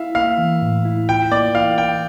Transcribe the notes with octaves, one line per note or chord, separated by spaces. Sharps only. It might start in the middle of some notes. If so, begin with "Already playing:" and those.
Already playing: E4 E5 F5
A#3 F5
E3
A2
E4
F4 G5
A#3 D5
E3 F5
E3 G5